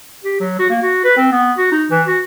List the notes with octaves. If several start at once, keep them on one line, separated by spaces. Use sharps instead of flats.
G4
F#3
F#4
A#3
F#4
B4
C4
B3
F#4
D#4
E3
F#4